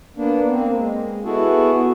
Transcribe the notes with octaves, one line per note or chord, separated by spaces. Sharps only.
A#3 B3 D4
A#3 C4
G#3
B3 E4 F#4 G#4 A4